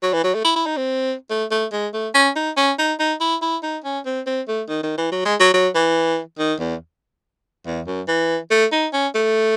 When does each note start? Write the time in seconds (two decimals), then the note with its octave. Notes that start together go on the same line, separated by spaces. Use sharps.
0.02 F#3
0.13 E3
0.24 F#3
0.35 A3
0.45 E4
0.56 E4
0.66 D#4
0.77 C4
1.30 A3
1.51 A3
1.72 G#3
1.93 A3
2.15 C#4
2.36 D#4
2.57 C#4
2.78 D#4
2.99 D#4
3.20 E4
3.42 E4
3.63 D#4
3.84 C#4
4.06 C4
4.26 C4
4.48 A3
4.69 D#3
4.83 D#3
4.98 E3
5.12 F#3
5.25 G#3
5.40 F#3
5.54 F#3
5.75 E3
6.39 D#3
6.60 E2
7.66 E2
7.87 F#2
8.08 E3
8.51 A3
8.72 D#4
8.93 C#4
9.15 A3